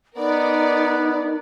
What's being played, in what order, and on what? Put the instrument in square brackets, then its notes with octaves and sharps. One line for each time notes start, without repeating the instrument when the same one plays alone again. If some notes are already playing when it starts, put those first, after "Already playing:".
[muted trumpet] B3 [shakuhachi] D#4 [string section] A#4 D5